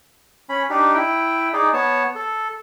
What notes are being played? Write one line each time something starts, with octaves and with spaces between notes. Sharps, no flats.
C#4 B5
D4 D#4 G4
E4 G5
D#4 G#4 D5
B3 C#5 A5
A4